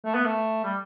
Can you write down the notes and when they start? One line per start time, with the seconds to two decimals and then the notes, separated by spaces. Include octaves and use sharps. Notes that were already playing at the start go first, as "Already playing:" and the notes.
0.05 A3
0.14 B3
0.26 A3
0.64 G3